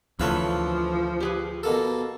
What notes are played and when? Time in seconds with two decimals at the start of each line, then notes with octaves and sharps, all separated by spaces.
0.20 D2 C#3 E3 F3 A4 C#5 F5 B5
1.20 G4 G#4 B4
1.63 B2 A#3 A4